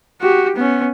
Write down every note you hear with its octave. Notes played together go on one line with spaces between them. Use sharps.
F#4 G4
B3 C#4